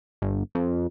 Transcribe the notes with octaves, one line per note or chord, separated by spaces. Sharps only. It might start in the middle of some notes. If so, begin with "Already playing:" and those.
G1
F2